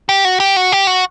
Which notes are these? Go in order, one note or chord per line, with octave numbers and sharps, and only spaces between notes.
G4
F#4
G4
F#4
G4
F#4